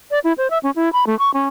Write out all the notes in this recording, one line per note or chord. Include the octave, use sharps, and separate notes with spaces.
D5
E4
C5
E5
C#4
E4
B5
A3
C#6
C#4